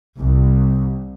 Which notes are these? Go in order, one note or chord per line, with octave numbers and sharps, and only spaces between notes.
C2